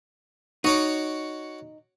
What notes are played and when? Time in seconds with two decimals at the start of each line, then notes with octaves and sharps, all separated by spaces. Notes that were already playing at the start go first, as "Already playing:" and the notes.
0.64 D#4 F#4 C#5 D6